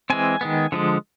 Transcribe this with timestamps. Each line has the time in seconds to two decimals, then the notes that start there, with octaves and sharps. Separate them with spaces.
0.10 E3 G#3 C4 G#5
0.41 D#3 G#3 B3
0.72 D3 F3 G#3